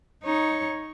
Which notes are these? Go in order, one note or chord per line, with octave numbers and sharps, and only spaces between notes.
D#4 C#5